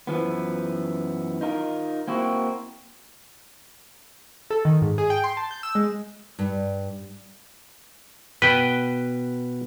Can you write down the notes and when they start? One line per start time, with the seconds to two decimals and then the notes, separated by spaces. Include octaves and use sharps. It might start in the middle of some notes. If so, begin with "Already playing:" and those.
0.07 F#2 E3 F3 B3
1.41 D#4 F4 A#4
2.08 A#3 C4 E4 F#4
4.50 A4
4.65 D#3
4.82 G#2
4.98 G#4
5.10 G5
5.24 C6
5.37 A5
5.51 G6
5.63 E6
5.75 G#3
6.39 G2
8.42 B2 B4 G5